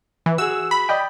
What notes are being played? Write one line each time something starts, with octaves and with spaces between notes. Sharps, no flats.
E3
F#4 G#4 E6
B5
D5 D#5 G5